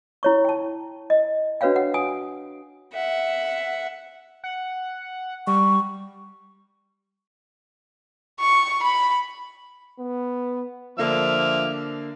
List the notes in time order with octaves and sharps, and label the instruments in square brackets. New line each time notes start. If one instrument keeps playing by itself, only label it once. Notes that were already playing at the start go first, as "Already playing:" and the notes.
[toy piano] E4 C#5 C#6
G5 A5
D#5
D4 F#4 B4 C#5 F5 G5
F#5
G#5 D#6
[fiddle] E5 F#5
[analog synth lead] F#5
[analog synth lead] G3 [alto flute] C#6
[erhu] C#6
B5
[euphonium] B3
[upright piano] D3 A#3 D4 [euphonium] F3 [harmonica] E5 D6 F6